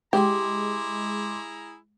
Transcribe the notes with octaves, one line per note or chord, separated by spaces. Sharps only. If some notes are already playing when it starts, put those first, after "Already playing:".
G#3 E4 G4 G#4 A#5 C6 D6